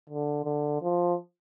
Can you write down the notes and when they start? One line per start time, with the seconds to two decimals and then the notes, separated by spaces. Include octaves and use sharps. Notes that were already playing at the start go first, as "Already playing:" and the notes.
0.09 D3
0.45 D3
0.82 F3